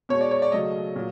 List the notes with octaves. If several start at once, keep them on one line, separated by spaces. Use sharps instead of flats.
B2 G#3 C#5
D5
C#5
D5
C#3 F#3 A3 D#5
A#2 F#3